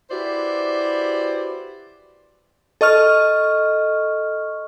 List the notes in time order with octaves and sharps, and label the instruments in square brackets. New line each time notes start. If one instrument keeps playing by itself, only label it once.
[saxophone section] E4 F#4 G4 B4 C5 D5
[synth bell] A4 D#5 C#6 F6